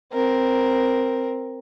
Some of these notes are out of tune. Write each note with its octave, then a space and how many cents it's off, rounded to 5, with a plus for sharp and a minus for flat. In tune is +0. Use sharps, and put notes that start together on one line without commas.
C4 +0 A#4 +0